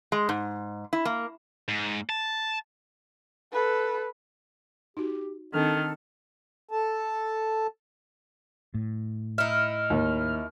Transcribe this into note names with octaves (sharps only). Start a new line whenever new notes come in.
G#3
G#2
E4
A#3
G#2
A5
A4 B4
D#4 F#4 G4
D#3 C4 D4 A4 F6
A4 A5
A2
D#4 E4 F6
D#2